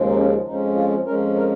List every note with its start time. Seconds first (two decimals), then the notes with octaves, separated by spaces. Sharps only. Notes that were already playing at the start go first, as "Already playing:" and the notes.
Already playing: D#2 C#3 F3 G#3
0.09 D#4
0.17 C#4
0.47 F2 F3 G#3 C#4 D#4
0.76 F4
1.06 F2 F3 G#3 C#4 A#4
1.36 A#4